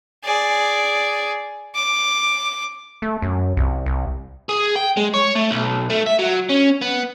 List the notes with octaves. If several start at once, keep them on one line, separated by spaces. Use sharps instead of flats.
G#4 D5
D6
A3
F#2
C2
C2
G#4
G5
G#3
C#5
A3
B1
A3
E5
F#3
C#4
B3